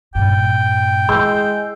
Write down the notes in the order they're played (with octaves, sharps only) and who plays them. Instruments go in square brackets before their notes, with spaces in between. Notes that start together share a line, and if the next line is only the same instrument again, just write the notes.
[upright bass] G2 A#2 [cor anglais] G5
[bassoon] G#3 [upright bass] E4 [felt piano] C6 E6 G6